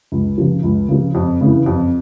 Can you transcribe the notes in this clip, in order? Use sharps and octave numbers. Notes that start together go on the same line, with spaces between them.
C#2
C#3 F3
C#2
C#3 F3
F2
C#3 E3
F2